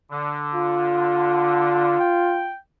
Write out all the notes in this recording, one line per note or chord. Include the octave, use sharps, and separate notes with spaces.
D3
F4
G5